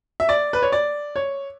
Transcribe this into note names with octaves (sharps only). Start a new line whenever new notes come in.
E5
D5
B4
C#5
D5
C#5